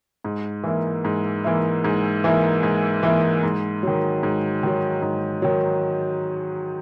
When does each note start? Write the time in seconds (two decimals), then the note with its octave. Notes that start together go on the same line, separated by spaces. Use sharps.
0.24 G#2
0.63 E3 A#3 E4
1.05 G#2
1.44 E3 A#3 E4
1.84 G#2
2.24 E3 A#3 E4
2.63 G#2
3.03 E3 A#3 E4
3.43 G#2
3.83 D#3 F#3
4.23 G#2
4.63 D#3 F#3
5.02 G#2
5.42 D#3 F#3